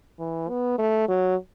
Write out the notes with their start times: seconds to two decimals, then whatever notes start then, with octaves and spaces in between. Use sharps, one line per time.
0.20 E3
0.49 B3
0.79 A3
1.09 F#3